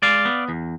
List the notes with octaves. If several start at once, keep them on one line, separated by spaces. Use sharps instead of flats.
G#3 D5 F5
B3
E2